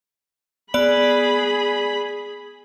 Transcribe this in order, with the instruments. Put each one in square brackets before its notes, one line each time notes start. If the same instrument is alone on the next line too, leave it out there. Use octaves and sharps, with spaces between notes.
[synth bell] B3 D5 F#7 [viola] G#4 B5